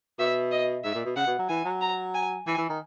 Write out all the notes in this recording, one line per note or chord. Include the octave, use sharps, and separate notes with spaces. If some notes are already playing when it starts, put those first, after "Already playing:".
B2 E5
D#5
G#2 E5
A#2
B2
C#3 F#5
B2
F#3
E3 G#5
F#3
A#5
G#5
E3 G#5
E3
D#3